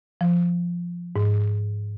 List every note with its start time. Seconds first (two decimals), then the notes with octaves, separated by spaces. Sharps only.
0.21 F3
1.16 G#2